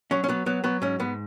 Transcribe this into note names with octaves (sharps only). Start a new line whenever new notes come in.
F#3 C#4
C#4
F#3 B3
F#3 B3
F#3 B3
G#2 C#4
G#2 B3